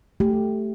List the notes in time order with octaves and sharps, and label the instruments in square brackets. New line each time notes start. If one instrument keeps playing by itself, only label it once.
[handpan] A3 G4